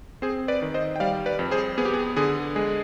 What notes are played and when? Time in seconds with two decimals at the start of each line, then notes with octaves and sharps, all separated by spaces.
0.22 C4 G#4 C5
0.48 B4 D5
0.62 D#3
0.74 C5 D#5
0.96 G5
1.00 G3 D5 F5
1.26 B4 D5
1.39 F2
1.51 G#4 C5
1.78 B3 G#4
1.85 G4
1.94 G#4
2.16 D3 G#4
2.56 G#3 G#4